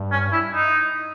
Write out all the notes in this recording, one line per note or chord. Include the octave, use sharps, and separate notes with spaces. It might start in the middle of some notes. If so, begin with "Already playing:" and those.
Already playing: G2
C#4
E4
D#4